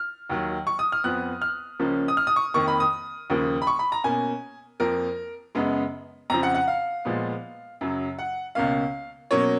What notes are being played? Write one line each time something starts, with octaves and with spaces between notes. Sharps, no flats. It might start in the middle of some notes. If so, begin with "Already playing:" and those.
Already playing: F6
D#2 D#3 F#3
C#6
D#6
F6
F2 F3 B3 F#6
F6
C#2 C#3 F3 A#3 C#4
D#6
F6
D#6
C#6
F2 D#3 A#3 C#6
B5
D#6
D#2 C#3 F3 A#3
B5
C#6
B5
A#5
B2 A#3 C#4 G#5
F2 F3 A#3 A#4
F#2 C#3 G#3 B3
F2 C#3 F3 A#5
F#5
F#5
F5
A#2 F3 G#3 B3
F#2 C#3 F#3
F#5
C#2 B2 A#3 C#4 F5
B2 F#3 A#3 C#4 C#5